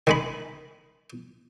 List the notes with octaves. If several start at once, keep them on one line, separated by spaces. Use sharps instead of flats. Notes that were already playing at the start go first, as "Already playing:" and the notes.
D#3 G#3 B5